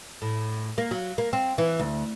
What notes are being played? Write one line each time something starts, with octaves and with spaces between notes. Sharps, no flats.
A2
A#3
F#3
A#3
C4
E3
D2